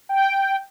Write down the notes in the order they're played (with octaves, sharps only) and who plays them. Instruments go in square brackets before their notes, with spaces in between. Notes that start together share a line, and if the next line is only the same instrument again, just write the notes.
[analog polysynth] G5